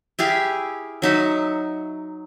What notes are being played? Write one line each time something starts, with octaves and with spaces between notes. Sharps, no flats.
E4 G4 G#4 F5
F#3 D#4 E5